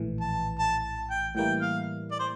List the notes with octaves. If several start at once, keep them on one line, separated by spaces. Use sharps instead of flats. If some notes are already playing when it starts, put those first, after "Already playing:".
Already playing: A#1 A2 E3
A5
A5
A5
G5
A2 E3 G3 A#3 E4 G5
F5
D5
C5